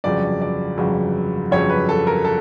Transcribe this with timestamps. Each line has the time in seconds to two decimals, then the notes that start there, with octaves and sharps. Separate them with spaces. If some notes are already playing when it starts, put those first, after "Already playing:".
0.04 G1 F2 C#3 F#3 D5
0.42 D5
0.78 G1 F2 C#3 F#3
1.51 G1 F2 C#3 F#3 C#5
1.70 B4
1.89 A4
2.07 A#4
2.25 A4